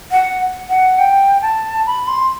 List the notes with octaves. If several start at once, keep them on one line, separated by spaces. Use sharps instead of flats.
F#5
F#5
G5
A5
B5
C6